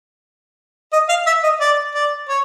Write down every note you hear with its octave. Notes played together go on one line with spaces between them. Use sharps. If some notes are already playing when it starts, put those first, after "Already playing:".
D#5
F5
E5
D#5
D5
D5
C#5